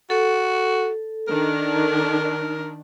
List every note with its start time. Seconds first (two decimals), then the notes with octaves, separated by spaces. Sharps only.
0.10 F#4 A4
1.28 D#3 D4 A#4